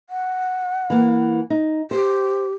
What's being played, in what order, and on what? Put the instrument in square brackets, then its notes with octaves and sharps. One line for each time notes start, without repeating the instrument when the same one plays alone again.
[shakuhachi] F#5
[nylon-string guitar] E3 A#3
D#4
[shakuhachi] G4 [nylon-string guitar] C5